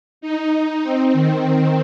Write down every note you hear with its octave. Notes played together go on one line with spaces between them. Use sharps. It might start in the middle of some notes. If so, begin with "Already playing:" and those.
D#4
C4
D#3